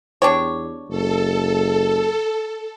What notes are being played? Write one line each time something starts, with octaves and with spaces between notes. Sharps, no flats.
E2 D4 G4 C#5
F#1 A4